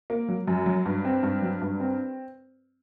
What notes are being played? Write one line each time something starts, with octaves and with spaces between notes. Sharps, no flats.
A#3
F#3
F#2
F#3
G2
C4
G2
F#3
G2
C4